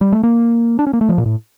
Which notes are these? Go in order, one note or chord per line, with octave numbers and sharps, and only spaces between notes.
G3
A3
A#3
D4
C#4
A#3
A3
F3
A#2
A2